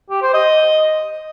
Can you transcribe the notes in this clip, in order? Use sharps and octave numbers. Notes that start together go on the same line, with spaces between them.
G4
C5
D#5